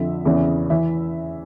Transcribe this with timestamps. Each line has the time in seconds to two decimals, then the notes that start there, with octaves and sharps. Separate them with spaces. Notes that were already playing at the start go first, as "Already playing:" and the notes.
Already playing: F2 D3 F3 E5
0.25 E2 C#3 E3
0.70 E3 E5